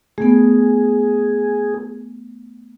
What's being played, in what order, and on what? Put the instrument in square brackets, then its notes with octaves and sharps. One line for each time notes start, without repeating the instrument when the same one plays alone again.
[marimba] A3 B3 [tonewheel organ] G#4